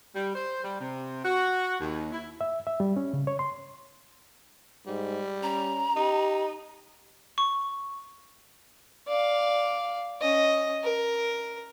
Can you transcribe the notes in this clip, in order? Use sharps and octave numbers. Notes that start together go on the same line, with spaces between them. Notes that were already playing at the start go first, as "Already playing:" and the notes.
G3
C5
G3
C3
F#4
D#2
E4
E5
E5
G3
C#4
C#3
C#5
C6
G#2 G3
C#4 A#5
D#4 G4
C#6
D5 F5
C#4 D#5
A#4